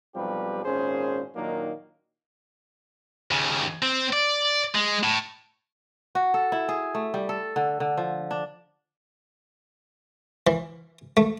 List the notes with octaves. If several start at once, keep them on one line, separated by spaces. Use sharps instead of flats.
B1 F3 G3 C4 G4 B4
G#1 A#2 C#4 G#4 C5
A#2 D#3 F#3 A#3 D4 D#4
D#2 C#3
C4
D5
G#3
A2
F#4
A4
E4
G#4
A3
G3
A4
D3
D3
F3
D4
E3
A3